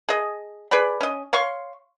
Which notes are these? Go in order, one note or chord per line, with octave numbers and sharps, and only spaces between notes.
G#4 D#5
G#4 B4 D5 B5
C#4 D#5
C#5 F5 C6 C#6